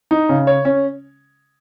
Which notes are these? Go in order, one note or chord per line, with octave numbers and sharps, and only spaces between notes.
D#4
C#3
C#5
C#4